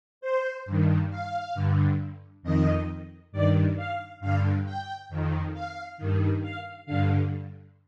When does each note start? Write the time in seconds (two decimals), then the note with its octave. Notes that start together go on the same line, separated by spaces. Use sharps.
0.21 C5
0.66 G2 D#3
1.10 F5
1.55 G2 D3
2.43 F2 D#3 D#5
3.32 G2 D#3 D5
3.76 F5
4.20 G2 D3 F5
4.65 G5
5.09 F2 D#3
5.53 F5
5.98 G2 D#3
6.42 F5
6.86 G2 D3 F5